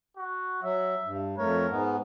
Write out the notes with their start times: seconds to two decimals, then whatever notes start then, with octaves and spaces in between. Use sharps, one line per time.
0.17 F#4
0.63 F#3 E5
1.05 G2
1.38 F2 A3 A#4 C#5
1.70 G#2 G#3 B3